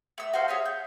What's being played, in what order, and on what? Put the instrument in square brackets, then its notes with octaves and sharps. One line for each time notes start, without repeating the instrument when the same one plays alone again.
[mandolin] A3 E6
F#4 A4 C5 F5
G#4 C#5 E5 G#5
G6